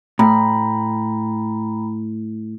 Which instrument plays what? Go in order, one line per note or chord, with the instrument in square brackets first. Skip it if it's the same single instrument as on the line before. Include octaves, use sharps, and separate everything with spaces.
[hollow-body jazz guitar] A2 [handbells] G5 A#5 B5